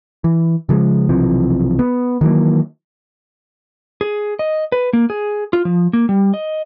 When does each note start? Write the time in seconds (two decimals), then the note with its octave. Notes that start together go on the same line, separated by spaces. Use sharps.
0.24 E3
0.69 C#3 F3 F#3 G#3
1.09 B1 C3 E3 F3
1.79 B3
2.21 D#3 E3 F#3 A#3
4.01 G#4
4.39 D#5
4.72 B4
4.93 A#3
5.10 G#4
5.53 F4
5.65 F3
5.93 A#3
6.09 G3
6.34 D#5